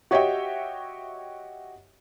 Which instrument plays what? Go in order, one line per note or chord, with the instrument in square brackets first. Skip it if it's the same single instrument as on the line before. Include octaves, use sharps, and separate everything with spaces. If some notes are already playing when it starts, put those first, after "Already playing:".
[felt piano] F#4 G4 C#5 D#5 E5 G5